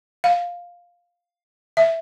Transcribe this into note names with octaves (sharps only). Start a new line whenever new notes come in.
F5
E5